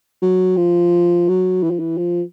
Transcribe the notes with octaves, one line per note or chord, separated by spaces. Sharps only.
F#3
F3
F#3
E3
F3
E3
F3